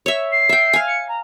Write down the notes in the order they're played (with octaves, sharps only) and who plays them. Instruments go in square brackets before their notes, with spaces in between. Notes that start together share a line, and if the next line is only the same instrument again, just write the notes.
[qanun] C#5 E5
[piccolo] C7
[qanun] E5 G5
F5 G#5
[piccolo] C#7
A#5